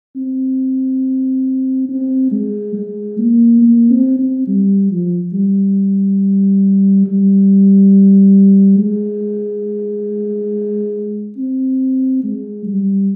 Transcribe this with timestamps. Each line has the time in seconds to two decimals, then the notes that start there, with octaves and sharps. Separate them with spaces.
0.16 C4
1.89 C4
2.32 G#3
2.75 G#3
3.19 A#3
3.62 A#3
3.91 C4
4.19 C4
4.47 G3
4.91 F3
5.33 G3
7.07 G3
8.78 G#3
11.38 C4
12.24 G#3
12.66 G3